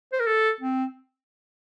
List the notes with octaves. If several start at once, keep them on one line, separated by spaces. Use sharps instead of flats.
C5
A#4
A4
C4